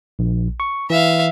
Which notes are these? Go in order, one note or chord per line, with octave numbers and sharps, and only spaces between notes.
A#1
C#6
E3 E5 F5